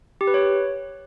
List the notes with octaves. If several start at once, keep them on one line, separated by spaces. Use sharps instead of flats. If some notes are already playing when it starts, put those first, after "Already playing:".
G4
B4
C#5